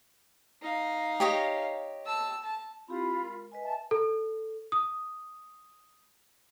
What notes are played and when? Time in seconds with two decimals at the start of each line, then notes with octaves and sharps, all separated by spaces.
0.62 D#4 F5
1.20 G4 C#5 D#5
2.05 A5 E6
2.43 A5
2.88 C4 E4 F4 G4 B5
3.21 G#3 A#4
3.52 B4 D#5 G#5
3.63 E5 G#5 A5
3.91 A4
4.72 D#6